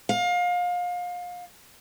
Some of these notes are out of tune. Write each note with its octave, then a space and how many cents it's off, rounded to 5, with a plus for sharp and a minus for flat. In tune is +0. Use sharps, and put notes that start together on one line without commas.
F5 +30